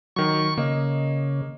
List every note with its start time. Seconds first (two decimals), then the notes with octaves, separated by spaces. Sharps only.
0.16 D#3 F#3 C#6
0.58 C#3 A#3 D#5